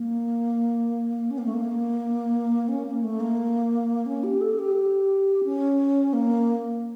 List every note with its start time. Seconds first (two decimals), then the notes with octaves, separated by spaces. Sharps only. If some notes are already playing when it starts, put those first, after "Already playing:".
Already playing: A#3
1.31 C#4
1.38 A#3
1.46 A3
1.54 A#3
2.68 C#4
2.86 A#3
3.03 A3
3.20 A#3
4.06 C#4
4.24 G4
4.41 A4
4.59 G4
4.75 G4
5.44 C#4
6.13 A#3